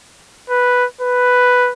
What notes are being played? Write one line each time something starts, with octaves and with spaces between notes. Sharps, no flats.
B4
B4